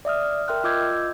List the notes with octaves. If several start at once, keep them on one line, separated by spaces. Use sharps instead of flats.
D5 E5 D#6 F6
A#4 E5 G5 C6 F6 F#6
F4 D#5 D6 E6 G6 G#6